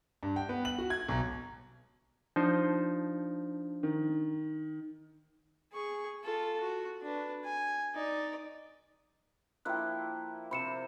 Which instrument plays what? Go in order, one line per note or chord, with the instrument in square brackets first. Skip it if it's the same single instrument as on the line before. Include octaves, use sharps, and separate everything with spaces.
[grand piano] G2
G5
B3
F#7
F#4
G#6
B1
[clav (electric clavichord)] F3 D#4 C5 [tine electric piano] D4
[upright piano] D#3
[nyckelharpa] G#4 C#6
F4 A4
F#4
D4 B4
G#5
D#4 D5
[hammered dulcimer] F3 A#3 E4 [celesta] G5 F#6
[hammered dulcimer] C3 C5 [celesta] B5 C#7 E7